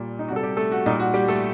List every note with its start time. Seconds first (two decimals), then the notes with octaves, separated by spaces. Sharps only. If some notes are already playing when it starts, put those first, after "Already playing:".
Already playing: A#2 G3
0.19 D#4
0.28 C3 G3 F#4
0.36 A4
0.43 G3 G4
0.57 A3 A4
0.71 F#4
0.86 A#2 G3 D#4
1.00 F#4
1.14 G3 G4
1.28 A3 A4